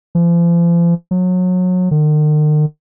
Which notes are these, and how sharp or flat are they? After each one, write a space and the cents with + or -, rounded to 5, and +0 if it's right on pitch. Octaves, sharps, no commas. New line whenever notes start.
F3 -40
F#3 -25
D#3 -45